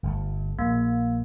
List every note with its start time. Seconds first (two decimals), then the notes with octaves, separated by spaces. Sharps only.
0.03 G1 A#2 A3
0.59 A#1 A#3